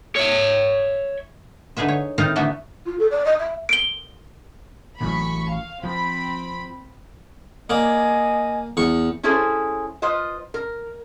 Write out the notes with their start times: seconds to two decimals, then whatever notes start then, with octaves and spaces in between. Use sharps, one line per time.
0.16 C#5 E5
1.77 D3 D#4 G#4 B4 E5
1.88 C#5
2.18 A2 D#3 C4 D#4 F4 A#5
2.36 D3 E3 A3 B3 F#4 E5
2.86 F4
2.99 A4
3.11 D5
3.25 D#5
3.40 E5
3.69 D7 G7
5.01 A1 E3 F#3 B5 C#6
5.51 F5
5.84 F3 C4 B5
7.70 A#3 D5 D#5 G#5
8.77 E2 C#6
9.23 C#4 E4 G#4 A4 C5
10.02 F4 B4 C5 D#5
10.54 A#4